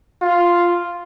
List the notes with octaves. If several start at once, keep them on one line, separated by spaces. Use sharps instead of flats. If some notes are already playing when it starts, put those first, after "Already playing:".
F4